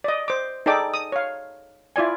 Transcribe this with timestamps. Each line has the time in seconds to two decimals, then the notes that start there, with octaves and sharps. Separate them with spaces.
0.04 D5 D#5
0.28 C5 D6
0.66 D#4 G#4 A4 D5 G5 D6
0.94 D#6
1.12 C#5 F5
1.96 E4 F4 D5 G#5